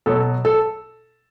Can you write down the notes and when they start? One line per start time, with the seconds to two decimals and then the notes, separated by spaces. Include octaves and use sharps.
0.06 B2 F#3 A4
0.45 A4